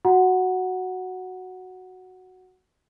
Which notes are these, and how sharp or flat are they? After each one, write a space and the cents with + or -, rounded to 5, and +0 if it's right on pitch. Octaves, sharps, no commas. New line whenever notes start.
F#4 +0 F#5 +0 A#5 +15